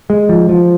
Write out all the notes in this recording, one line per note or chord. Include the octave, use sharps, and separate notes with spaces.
G#3
F3
F3